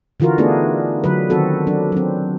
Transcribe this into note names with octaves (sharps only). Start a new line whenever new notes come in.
D3 E3 F4 F#4 A#4
A3 B3 D4 D#4 G#4
D3 F#3 B4
D#3 C4 F#4 A4
F#3 D4
F#3 C4